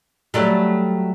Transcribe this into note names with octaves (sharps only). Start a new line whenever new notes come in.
F#3 G3 A3